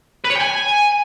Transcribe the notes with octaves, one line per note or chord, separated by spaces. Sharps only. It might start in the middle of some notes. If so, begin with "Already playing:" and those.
B4
C#5
G5
G#5